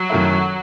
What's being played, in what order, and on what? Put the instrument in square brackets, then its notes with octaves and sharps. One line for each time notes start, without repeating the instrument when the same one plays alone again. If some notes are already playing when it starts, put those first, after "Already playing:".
Already playing: [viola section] F#3
[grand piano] F#2 D#3 A3 E4